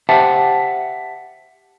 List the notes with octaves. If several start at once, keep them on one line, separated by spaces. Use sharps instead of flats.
G4 C5 E5 F#5 G5 A5